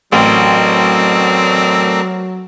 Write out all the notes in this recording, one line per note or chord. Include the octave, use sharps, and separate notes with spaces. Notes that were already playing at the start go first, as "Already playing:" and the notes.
A1 F#3 A3 C4 A#4 D5